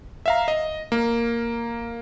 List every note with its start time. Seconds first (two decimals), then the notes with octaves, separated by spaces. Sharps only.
0.26 E5 F5 A#5
0.48 D#5
0.92 A#3